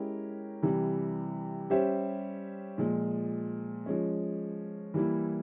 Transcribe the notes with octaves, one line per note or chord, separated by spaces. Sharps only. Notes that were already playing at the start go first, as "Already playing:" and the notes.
Already playing: G#3 C#4 E4 G4 A#4
C3 E3 G3
G3 C#4 G4 C5 E5
A#2 F3 G#3
F3 G#3 C#4
E3 G3 A#3 E4